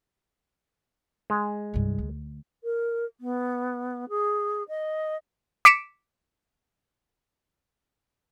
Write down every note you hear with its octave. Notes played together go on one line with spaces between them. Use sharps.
G#3
C2 G2
D2
A#4
B3
G#4
D#5
D6 B6 C#7 D7 E7